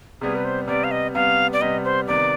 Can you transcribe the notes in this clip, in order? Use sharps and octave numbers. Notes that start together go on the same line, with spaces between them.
C3 G3 B3 G#4
B4
C5
C3 G3 B3 D5
F5
D#5
C3 G3 B3 F5
D5
C3 G3 B3 D#5
C5
C3 D#3 B3 D5